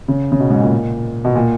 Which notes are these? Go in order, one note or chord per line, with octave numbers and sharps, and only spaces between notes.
C#3
C#3
B2
G#2
A#2
B2
A#2